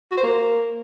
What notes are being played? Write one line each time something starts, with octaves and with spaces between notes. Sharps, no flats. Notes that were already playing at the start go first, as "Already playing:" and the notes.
F#4
C5
A#3